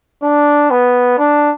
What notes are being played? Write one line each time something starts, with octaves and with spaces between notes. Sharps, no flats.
D4
B3
D4